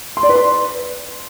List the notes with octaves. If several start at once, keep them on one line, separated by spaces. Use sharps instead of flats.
C6
D5
B4
C6